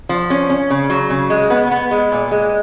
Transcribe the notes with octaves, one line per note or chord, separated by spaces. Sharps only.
F3
C#4
C#4
C#3
F#3
C#3
G#3
B3
B3
G#3
A#2
G#3